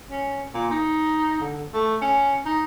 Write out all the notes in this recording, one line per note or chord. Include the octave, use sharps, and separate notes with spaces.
C#4
A#2
D#4
D3
A3
C#4
D#4